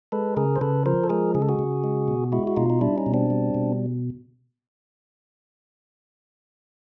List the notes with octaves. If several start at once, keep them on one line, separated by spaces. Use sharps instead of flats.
G#3 A4 B4
C#3 G#4 A#4
C5
C#3 A4 B4
F3 A#4 C5
A4
G#3 G#4 A#4
C#3 G#4
A4
F#4 G#4
C#3
G#3
B2
G#3 E4 F#4
F#4
B2 D#4 F4
D#4
G3 D4 E4
C#4 D#4
B2
C4 D4
G3
B2